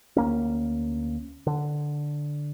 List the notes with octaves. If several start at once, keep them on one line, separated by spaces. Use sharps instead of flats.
D2 A#3 C#4
D3